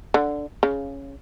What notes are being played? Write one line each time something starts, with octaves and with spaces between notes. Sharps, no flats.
D3
C#3